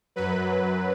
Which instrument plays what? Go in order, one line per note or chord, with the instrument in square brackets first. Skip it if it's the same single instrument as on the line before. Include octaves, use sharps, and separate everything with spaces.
[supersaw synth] F#2 F#3 B4